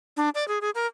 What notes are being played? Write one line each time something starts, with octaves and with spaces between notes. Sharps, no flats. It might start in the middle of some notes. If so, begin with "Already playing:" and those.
D4
D5
G#4
G#4
A#4